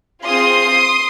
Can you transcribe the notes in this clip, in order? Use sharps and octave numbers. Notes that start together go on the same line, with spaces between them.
C4 F4 G#4 C6 D#6